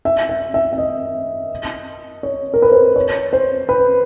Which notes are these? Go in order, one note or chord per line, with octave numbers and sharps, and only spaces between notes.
E5
E5
E5
E5
D#5
C#5
A#4
B4
C5
C#5
C5
B4